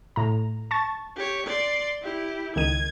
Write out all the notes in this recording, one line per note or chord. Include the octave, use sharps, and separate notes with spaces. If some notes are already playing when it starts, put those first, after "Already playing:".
A2 A#5
A5 C#6 A6
G4 C#5
D5 C6
E4 G4
C#2 D#3 G#6 D#7